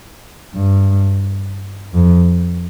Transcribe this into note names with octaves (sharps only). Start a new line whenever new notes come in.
G2
F2